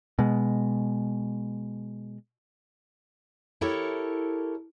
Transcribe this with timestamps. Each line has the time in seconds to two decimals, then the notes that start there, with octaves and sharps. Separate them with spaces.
0.19 B2 G#3
3.61 E4 G4 A4 A#4 C#5